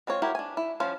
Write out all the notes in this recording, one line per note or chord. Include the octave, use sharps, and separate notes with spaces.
G#3 C4 F4 C#5
E4 F#4 G4 A#4 C#5
D4 G#5
E4
F3 G3 C#4 C5 F5